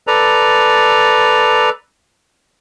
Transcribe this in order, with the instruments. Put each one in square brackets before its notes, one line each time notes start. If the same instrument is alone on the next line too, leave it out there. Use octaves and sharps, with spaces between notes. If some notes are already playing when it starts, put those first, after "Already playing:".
[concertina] A4 B4 D5 A#5